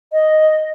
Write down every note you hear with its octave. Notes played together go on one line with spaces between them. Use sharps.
D#5